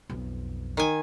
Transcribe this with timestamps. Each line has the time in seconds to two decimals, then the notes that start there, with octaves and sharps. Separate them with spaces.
0.10 B1 F2
0.77 D#3 G#5